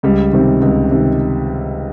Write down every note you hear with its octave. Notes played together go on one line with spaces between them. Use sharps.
C#2 G3
C3 D#3
C#2
C3 D#3